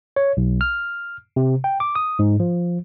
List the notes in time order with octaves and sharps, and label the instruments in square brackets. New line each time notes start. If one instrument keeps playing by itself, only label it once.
[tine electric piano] C#5
B1
F6
C3
G5
D6
D#6
G#2
F3